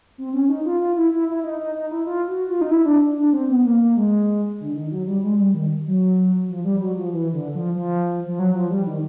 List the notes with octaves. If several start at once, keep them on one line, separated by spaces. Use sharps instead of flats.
C4
C#4
D#4
F4
F4
E4
E4
E4
D#4
D#4
D#4
E4
F4
F#4
F4
D#4
E4
D4
D4
C4
B3
A#3
A#3
G#3
D3
D#3
F#3
G3
G#3
G3
D#3
F#3
F3
G3
F#3
F3
E3
D3
F3
F3
F3
F#3
F3
G3
D#3